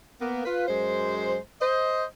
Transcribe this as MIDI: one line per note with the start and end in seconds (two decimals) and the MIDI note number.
0.21 0.45 58
0.21 0.45 59
0.45 0.66 65
0.45 0.66 71
0.68 1.37 42
0.68 1.37 56
0.68 1.37 72
1.62 2.04 72
1.62 2.04 75